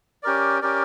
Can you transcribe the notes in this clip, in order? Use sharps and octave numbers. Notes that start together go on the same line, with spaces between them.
C#4 G4 A#4 D5
C#4 G4 A#4 D5